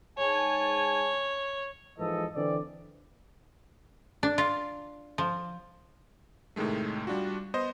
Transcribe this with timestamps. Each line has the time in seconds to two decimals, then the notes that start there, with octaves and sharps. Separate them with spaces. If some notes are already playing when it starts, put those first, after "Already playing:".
0.18 G#2 C#5 G#5 A5
1.99 G#2 E3 F3 A4 D#5
2.35 D3 E3 C4 D5
4.23 D4
4.38 F4
5.18 F3
6.56 A2 C3 D#3 G#3 A3
7.07 G3 D4 F4 F#4
7.54 B3 C5 D#5